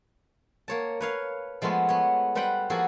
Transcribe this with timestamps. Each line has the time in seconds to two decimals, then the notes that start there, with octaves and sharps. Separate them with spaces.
0.68 A#3 C#5 A5
1.01 B4 C#5 F5
1.62 F3 G#3 A3 B3 F4
1.89 B3 C#5
2.35 G3 B4 C5 F#5 G5 B5
2.70 F3 A#3 B3 F#4 G#4 A4